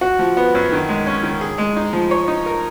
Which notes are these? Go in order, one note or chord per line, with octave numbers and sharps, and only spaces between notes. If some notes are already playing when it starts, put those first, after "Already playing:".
F#4
F3
B3
F#2
D#3
G#3
C#4
D#3
G#4
G#3
D#4
F3
C#5
D#4
A#4